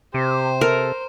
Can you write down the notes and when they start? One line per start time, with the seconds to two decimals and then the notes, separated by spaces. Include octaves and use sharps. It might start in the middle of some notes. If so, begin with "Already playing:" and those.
0.14 C3 G4 C5
0.61 A4 A#4